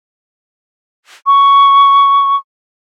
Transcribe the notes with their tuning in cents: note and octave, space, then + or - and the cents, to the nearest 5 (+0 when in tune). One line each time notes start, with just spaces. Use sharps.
C#6 +10